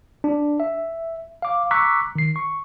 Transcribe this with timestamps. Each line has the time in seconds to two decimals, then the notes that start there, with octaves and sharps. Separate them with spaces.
0.24 D4
0.60 E5
1.42 F5 D6
1.71 A#5 C#6 D6 E6 F#6 B6
2.16 D#3 C7
2.36 C#6